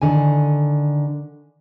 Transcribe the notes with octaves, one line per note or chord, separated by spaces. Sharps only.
D3 D#3 G#5